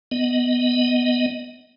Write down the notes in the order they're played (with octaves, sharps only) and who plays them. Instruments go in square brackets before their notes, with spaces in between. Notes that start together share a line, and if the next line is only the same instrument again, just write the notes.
[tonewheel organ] B3 D#5